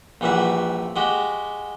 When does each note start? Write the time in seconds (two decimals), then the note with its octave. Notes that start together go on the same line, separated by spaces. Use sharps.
0.21 A#1 E3 G3 F#4 E5
0.96 G#3 F#4 G4